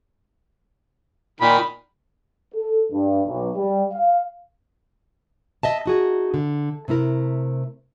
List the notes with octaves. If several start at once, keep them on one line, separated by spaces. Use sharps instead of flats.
A#2 D#3 B5
A4
G2
B1
G3
F5
D#5 E5 A5
D#4 F#4 G#4
D3
C3 A3 E4 A#4